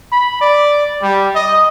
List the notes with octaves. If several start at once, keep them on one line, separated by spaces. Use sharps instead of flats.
B5
D5
G3
D#5